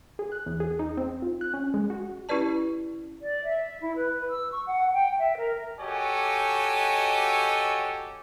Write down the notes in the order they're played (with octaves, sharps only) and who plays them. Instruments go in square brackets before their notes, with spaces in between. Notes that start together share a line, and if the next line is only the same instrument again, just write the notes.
[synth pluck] G#4
F#6
E2
G#4
D#4
C4
F4
F#6
C#4
G#3
F#4
[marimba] C#4 E4 G4 B4 D5 A5
[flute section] D5
E5
E4
B4
E6
C#6
F#5
G5
E5
A#4
[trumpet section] F#4 G4 A4 C#5 D#5 G#5